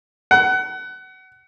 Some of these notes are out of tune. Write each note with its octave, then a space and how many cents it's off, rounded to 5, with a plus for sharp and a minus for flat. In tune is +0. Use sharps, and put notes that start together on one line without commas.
F#5 +25